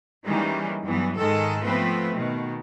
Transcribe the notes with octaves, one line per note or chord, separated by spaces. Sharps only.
D#3 E3 G3 G#3 A#3 C#4
G2 E3 F#3 B3
G#2 D#3 G#3 A4
F3 A3 B3 C4 B4
B2 D#3